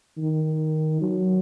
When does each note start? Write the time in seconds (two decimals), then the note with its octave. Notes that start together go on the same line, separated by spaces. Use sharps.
0.18 D#3
1.02 F#3